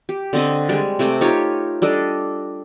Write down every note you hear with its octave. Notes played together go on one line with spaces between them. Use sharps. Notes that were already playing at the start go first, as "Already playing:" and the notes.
G4
D3 C4 D#5
G3 G#3
C3 A3 G5 D6
D#4 F4 G4 C#5
G3 D4 A4 D#5